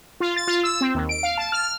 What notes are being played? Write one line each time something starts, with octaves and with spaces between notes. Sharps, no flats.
F4
A6
F4
E6
C4
D#2
D7
F5
A5
F6